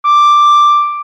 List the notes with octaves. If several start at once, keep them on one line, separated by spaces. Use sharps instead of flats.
D6